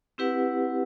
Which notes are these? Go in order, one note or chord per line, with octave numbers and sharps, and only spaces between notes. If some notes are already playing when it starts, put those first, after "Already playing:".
C4 E4 G4 B4 F#5